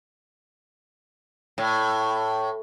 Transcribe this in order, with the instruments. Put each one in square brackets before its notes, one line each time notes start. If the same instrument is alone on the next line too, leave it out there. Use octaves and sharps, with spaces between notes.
[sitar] A2